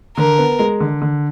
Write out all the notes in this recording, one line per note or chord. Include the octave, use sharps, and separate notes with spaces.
D3 A#4
B3
G#3
D3
D3